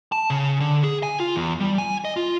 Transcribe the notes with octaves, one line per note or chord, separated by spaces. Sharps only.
A5
C#3
D3
G#4
G#5
F4
E2
G3
G#5
D#5
F4